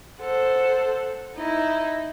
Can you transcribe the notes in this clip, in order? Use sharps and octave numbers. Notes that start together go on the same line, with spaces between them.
A4 C5 F#5
D#4 E4 D#5